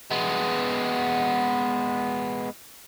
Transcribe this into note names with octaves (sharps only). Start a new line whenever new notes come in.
G#3 B3